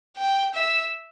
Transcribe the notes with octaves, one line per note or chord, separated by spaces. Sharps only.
G5
E5